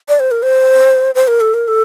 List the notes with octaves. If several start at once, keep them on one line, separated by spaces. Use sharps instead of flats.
D5
C5
A#4
C5
C5
A#4
A4
A#4
A4